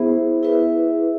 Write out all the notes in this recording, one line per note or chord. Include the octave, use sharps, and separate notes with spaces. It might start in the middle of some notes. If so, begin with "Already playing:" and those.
Already playing: B3 E4 G#4 C5 E5
E4 G#4 B4 E5